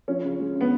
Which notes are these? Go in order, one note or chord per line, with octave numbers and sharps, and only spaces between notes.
F3 C#4
C#3
G#3
C#3
B3